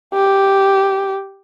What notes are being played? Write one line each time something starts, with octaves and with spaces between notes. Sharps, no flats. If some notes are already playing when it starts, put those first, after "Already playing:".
G4